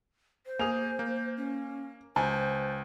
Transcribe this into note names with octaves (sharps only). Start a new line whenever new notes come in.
C5
A#3 G#4 G#5 F7
A#3
C#4
C#2 C5 G#5 A5